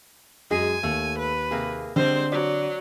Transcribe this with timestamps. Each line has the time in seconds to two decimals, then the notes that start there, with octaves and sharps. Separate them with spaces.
0.51 F#2 G#3 G#4 G#5
0.83 D#2 A3
1.19 B4
1.51 C3 A#3 G#4
1.96 D3 G3 G#3 C4 C5
2.32 F#3 D5